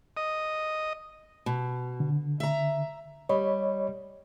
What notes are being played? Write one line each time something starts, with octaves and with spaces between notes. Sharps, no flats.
D#5
B2
D3
E5 A#5
G3 C#5 D#5 B5